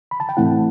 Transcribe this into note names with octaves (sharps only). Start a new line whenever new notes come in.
B5
A5
G5
A2 E3 A3 C4 E4 F#5